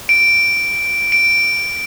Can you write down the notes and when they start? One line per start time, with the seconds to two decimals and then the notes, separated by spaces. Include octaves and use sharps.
0.09 D7
1.12 D7